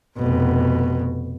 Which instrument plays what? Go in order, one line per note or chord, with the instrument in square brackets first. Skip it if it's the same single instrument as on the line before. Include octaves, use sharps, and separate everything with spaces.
[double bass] F1 B2